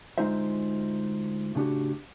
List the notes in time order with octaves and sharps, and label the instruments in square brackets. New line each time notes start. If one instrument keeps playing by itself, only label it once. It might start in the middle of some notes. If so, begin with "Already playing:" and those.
[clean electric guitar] D2 G#3 D#4 F4 C5 E5
A2 C#3 D4 F#4 G4